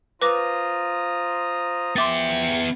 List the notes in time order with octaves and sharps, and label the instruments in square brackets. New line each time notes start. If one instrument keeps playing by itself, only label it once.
[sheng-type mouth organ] F4 [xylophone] B4 D6 A#6 [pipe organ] C5 A#5 D#6
[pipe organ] F3 [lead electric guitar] B3 E5 [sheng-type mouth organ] G5 [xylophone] C6 D6 A6